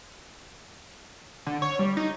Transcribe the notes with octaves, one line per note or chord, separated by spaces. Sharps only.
D3
C#5
G3
D#4